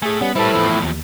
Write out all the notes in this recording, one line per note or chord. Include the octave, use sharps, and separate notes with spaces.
A2 A3 G#4 G#5
G3 B3 C#4 F#5
A2 G3 E4 A4 B4 C5
E2 F3
D#2